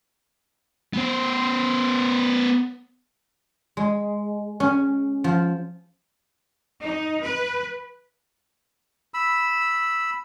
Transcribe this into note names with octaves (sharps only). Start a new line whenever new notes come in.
B3 C5
G#3
C#4
F3
D#4
B4
B5 E6